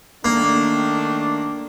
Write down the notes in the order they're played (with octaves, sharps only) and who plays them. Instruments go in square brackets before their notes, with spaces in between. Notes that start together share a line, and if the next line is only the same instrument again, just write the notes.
[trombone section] D#3 A3 D4 [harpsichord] A#3